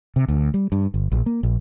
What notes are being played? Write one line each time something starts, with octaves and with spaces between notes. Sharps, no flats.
C3
D2
G3
G2
G1
A#1
A#3
A#1